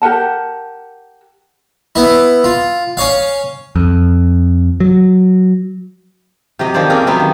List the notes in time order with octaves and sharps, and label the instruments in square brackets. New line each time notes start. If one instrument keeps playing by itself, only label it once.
[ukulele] G4 A#4 F#5 A5
[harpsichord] B3 E4
F4
C#4 C#5 F5
[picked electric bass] F2
F#3
[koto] C3 F#3 G4 D#5
D#3 F3 C4 C5 D5
A#3 C4 C#4 F4 G#4 A#4
C3 F#3 B3 C4
D#3